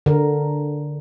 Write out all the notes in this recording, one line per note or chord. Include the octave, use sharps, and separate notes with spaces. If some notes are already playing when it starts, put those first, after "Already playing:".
D3 A#4